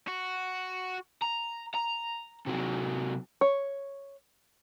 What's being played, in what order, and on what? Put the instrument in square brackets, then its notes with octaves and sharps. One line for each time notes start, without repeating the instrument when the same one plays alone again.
[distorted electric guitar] F#4
[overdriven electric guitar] A#5
A#5
C3 F#3
[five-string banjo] C#5